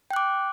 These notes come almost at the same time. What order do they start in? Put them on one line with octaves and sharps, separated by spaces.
G5 F#6 D6